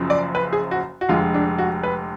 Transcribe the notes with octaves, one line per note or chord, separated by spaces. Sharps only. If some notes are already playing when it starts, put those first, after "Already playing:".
Already playing: F#1 F#2 C#3 F3
D5
B4
G#4
F#4
F#4
F1 F2 D3 G#3 F4
D4
F#4
B4